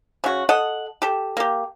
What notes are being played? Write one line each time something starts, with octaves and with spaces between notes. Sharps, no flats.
C#3 F#4
A4 D#5 F#5
G4 A4
A#3 G4